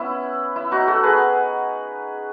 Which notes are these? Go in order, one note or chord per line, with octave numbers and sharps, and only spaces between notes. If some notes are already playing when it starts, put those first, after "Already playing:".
Already playing: B3 C#4 E4
E4
D#4 F#4
F#4 A4
G#4 B4